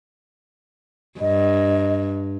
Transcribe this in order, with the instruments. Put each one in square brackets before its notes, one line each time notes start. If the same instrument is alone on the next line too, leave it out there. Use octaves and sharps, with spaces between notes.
[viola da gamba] G2 [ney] D#5